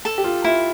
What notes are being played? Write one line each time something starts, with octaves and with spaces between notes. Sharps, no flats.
A4
G4
F4
E4 F4